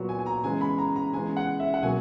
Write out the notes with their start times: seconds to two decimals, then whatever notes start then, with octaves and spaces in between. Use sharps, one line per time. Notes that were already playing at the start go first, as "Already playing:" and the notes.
Already playing: A#2 F#3 B3
0.09 G#5
0.19 G#5
0.26 A#5
0.44 C#3 E3 G#3 B3 G#5
0.61 B5
0.78 A#5
0.96 A#5
1.13 C#3 E3 G#3 B3 G#5
1.37 F#5
1.60 E5
1.74 F#5
1.83 B2 F#3 A#3 G#5